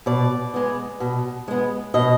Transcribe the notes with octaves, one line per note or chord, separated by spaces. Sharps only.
B2 D5
G#3 B3
B2
G#3 B3
B2 D#5